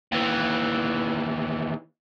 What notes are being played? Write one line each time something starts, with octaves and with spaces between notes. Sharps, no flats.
D#2 E3